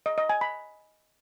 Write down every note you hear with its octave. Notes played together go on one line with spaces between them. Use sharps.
D#5
D#5
G#5
B5